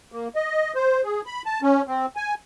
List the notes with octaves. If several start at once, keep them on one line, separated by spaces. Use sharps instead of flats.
A#3
D#5
C5
G#4
B5
A5
C#4
C4
G#5